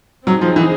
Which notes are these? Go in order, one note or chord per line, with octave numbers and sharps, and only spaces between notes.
F#3 C4 D#4 G#4
F3
E3